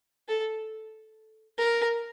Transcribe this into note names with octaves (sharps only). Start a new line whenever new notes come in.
A4
A#4